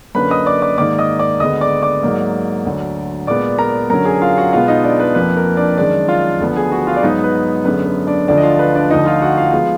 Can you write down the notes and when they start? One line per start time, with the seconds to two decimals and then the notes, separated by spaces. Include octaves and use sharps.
0.15 F#2 D3 F#3 A#3 B4 B5
0.31 D#5 D#6
0.46 D5 D6
0.62 D5 D6
0.78 G#2 D#3 A#3 D5 D6
0.98 D#5 D#6
1.19 D5 D6
1.40 D2 D3 G#3 B3 D#5 D#6
1.61 D5 D6
1.82 D5 D6
2.03 G#2 F#3 A#3
2.65 D2 D3 F#3
3.27 A#2 G#3 B3 D5 D6
3.59 A#4 A#5
3.90 F#2 D3 F#3 A#4 A#5
4.05 G#4 G#5
4.22 F4 F5
4.37 F#4 F#5
4.53 B2 G#3 B3 F4 F5
4.68 D#4 D#5
4.84 D4 D5
5.00 B4
5.15 F2 F3 A#3 B4
5.36 A#4
5.57 D4 D5
5.78 F#2 D#3 G#3 D4 D5
6.09 F4 F5
6.40 D2 D3 F3 B3
6.56 G#4 G#5
6.72 F#4 F#5
6.87 F4 F5
6.96 D5
7.02 G#2 F#3 B3 D#4 D#5
7.24 B4
7.65 F#2 D3 G#3 B3 B4
7.86 B4
8.07 D4 D5
8.28 D2 D3 F3 D4 D5
8.38 D#5
8.43 F4 F5
8.59 B4
8.75 D4 D5
8.90 D2 D3 F3 D#4 D#5
9.06 F4 F5
9.22 F#4 F#5
9.38 F4 F5
9.53 F3 G#3 B3